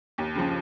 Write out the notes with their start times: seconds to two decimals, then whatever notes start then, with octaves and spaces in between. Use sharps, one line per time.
0.18 D#2
0.35 C#3 F3